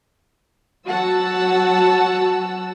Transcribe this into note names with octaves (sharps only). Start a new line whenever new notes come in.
F#3 F#4 F#5 A5 E6